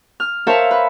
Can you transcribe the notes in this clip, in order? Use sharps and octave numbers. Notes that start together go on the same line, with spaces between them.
F6
A#4 C5 C#5 E5 F5 A5
B4